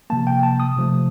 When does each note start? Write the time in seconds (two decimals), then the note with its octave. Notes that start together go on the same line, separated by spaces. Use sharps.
0.10 C3 F3 A#3 A5
0.27 G5
0.43 A5
0.60 D#6
0.77 C3 F3 A3